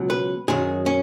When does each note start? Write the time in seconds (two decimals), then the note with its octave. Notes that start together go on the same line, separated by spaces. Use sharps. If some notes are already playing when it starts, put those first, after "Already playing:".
Already playing: C#2 B2 F#3
0.10 B4
0.48 F#2 D#3 F#3 G#4
0.86 C#4